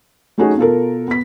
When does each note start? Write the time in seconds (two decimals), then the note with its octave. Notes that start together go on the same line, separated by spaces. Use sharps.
0.38 F#3 A3 C#4 D#4 F#4 G#4
0.57 B2 F4 A4 A#4
1.08 B3 B6